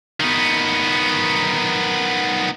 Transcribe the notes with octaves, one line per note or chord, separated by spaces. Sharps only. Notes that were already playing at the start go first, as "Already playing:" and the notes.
D#3 B3